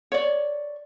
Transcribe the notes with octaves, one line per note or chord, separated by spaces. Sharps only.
C#5 D5